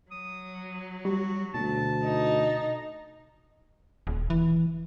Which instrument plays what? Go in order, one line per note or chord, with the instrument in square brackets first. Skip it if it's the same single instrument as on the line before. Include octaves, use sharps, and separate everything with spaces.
[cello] F#3 [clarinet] D#6
[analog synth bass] G3 [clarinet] F#4
[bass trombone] D2 [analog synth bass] B2 [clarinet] A5
[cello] D#4
[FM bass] D#1
E3